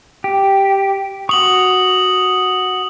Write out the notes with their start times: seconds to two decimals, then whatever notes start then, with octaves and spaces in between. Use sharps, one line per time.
0.24 G4
1.29 F#4 C#6 D#6 F#7